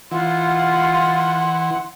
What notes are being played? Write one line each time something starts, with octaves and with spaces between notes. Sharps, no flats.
E3 F4 F#5 C6